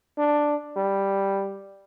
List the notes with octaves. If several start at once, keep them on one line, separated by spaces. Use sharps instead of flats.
D4
G3